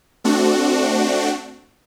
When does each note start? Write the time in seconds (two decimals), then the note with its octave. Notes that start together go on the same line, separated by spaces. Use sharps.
0.24 A3 C4 D4 F#4